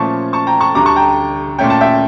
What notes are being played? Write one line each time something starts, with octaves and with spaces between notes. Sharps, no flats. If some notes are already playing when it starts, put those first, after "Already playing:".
Already playing: A#2 F3 A3 C#4 A5 C#6
A5 C#6
G5 A#5
A5 C#6
D2 D3 G3 A#5 D6
A5 C#6
G5 A#5
A#2 A3 C#4 G5
A5
E5 G5